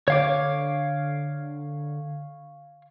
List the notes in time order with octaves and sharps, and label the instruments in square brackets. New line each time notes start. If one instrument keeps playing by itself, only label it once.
[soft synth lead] D3 [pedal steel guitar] C#5 F5 D6